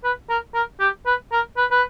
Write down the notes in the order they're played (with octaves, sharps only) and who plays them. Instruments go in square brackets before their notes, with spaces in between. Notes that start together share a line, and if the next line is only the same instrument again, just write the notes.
[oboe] B4
A#4
A#4
G4
B4
A#4
B4
B4